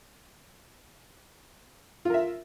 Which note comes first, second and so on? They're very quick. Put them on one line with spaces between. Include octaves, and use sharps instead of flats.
F4 A#4 E5